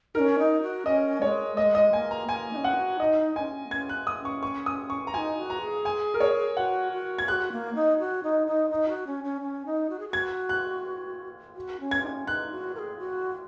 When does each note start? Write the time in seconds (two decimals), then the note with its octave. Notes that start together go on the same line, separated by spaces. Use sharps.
0.15 C#4 D#4 A#4
0.39 D#4
0.62 F#4
0.86 C#4 D#5
1.22 G#3 C#5
1.57 A#3 D#5
1.61 G#3
1.75 D#5
1.93 A#3 G#5
2.11 A#5
2.29 A#3 G#5
2.53 D#4
2.57 C#4
2.64 F#5
2.76 F#4
3.00 D#4 D#5
3.36 C#4 D#4 G#5
3.66 A#3
3.71 C#4 G#6
3.89 F#6
4.07 D#6
4.19 C#4
4.25 C#6
4.43 C#6
4.66 D#6
4.90 C#6
5.07 A#5
5.13 D#4 F#4 G#5
5.38 F#4
5.50 A#5
5.61 G#4
5.85 G#5
6.14 A#4
6.20 C#5
6.57 F#4 F#5
6.93 F#4
7.18 G#6
7.27 F#4 G#4 F#6
7.52 A#3
7.75 D#4
7.99 F#4
8.23 D#4
8.47 D#4
8.70 D#4
8.88 F#4
9.07 C#4
9.24 C#4
9.41 C#4
9.66 D#4
9.90 F#4
9.99 G#4
10.09 F#4 G#6
10.49 F#6
11.56 F#4
11.80 C#4
11.91 G#6
12.03 D#4
12.07 C#4
12.27 D#4 F#6
12.51 F#4
12.75 A#4
12.79 G#4
12.99 F#4